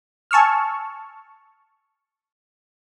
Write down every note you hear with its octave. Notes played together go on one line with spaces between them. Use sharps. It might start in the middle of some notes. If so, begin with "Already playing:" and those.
G#5 A5 C#6 E6 F6